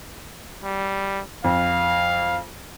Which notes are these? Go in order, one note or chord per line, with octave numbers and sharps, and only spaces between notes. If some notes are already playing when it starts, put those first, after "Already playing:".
G3
F2 F5